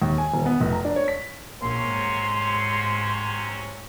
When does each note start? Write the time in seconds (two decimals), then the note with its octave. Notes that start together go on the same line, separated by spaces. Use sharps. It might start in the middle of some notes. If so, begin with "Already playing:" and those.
0.02 D#2
0.18 G#5
0.34 D#1
0.46 B3
0.60 F1
0.73 A#5
0.85 D4
0.96 C#5
1.08 B6
1.61 A#1 C3 F#3 A#3 C#4 C6
1.91 G#2